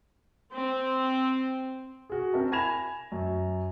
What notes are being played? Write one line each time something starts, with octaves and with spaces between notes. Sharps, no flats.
C4
F#4 G#4
C4 A#4 E5 A5
G#5 B5 G#6 A#6 E7 F7
F#2